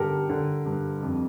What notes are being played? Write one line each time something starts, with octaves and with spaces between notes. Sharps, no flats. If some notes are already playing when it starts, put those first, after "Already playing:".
Already playing: G2 D3 G4 A4 A#4
D3
G2
F2